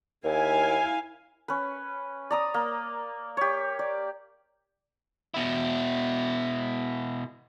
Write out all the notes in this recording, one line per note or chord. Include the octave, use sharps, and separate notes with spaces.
D#2 E4 F5 G#5
C#4 B4
D5 A#5 D#6
A#3
G4 C#5
D5
B2 E4